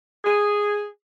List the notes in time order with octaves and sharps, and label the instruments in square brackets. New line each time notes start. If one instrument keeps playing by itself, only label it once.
[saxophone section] G#4